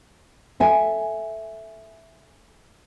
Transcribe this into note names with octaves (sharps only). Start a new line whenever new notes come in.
A4 E5 G#5